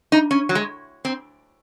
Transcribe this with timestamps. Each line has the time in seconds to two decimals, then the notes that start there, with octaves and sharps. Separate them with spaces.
0.12 D#4
0.31 C#4
0.49 F#3
0.55 G#3
1.05 C4